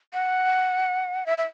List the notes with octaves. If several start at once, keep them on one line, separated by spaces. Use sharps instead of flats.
F#5
E5
E5